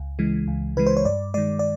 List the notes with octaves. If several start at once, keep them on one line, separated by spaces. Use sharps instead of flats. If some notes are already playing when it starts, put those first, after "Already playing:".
Already playing: C#2
C#3 E3 G#3
C#2
C#3 E3 G#3 B4
C5
C#5
G2 D5
D#3 G#3 D5
D5